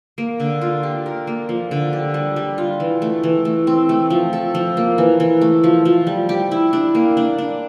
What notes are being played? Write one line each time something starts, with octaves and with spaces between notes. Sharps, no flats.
A#3
D3
F4
G4
A#4
A#3
F3
D3
G4
G3
G3
F4
E3
A3
E3
A3
C4
A3
F3
A4
F3
A#3
E3
E3
A3
F3
F3
G3
G4
E4
D4
A#3
D4
D4